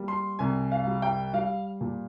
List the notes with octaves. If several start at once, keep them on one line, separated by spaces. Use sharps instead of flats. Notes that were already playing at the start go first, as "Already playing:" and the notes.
Already playing: G3 A#3
C6
C2 G#5
F5
G3
G5
G3 F5
A#2